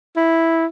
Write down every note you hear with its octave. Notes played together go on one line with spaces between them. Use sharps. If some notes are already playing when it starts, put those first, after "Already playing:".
E4